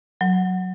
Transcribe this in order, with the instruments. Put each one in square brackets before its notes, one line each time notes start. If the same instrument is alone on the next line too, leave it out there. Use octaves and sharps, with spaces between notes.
[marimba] F#3